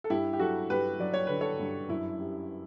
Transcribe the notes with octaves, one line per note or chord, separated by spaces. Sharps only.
A4
G2 E4 G4
G4
F#3 F#4 A4
G2 G4 B4
F#3 D5
C#5
D3 B4
A4 C#5
G2
F#2 E4
G3